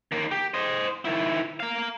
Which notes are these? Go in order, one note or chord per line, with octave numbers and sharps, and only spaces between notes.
D#3 A#3
G4
C5 D#5
D#3 E4
A#4 F5